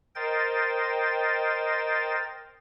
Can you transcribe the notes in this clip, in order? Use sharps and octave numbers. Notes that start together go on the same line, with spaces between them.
A#4 C5 D#5 G5 A6